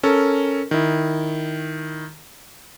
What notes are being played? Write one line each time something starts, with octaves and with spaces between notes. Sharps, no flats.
C#4 A4 A#4
D#3 E4